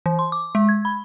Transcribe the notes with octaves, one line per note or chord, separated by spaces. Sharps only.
E3
C6
D6
G#3
G#6
B5